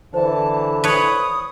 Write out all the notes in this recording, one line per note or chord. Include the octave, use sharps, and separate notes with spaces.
D3 E3 C5 D5 A5
B4 C#5 D#6